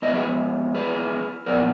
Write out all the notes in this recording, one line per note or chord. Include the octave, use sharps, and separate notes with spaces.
F2 F3 G#3 B3 B4 D#5
G#4 B4
G#4 B4
A#2 F3 B3 A#4 D5